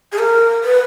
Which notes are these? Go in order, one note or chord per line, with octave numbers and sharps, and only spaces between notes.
G#4
A#4
B4